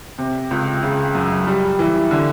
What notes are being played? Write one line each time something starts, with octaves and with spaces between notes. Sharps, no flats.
C3
C#2
C#3
F#2
G3
E3
D3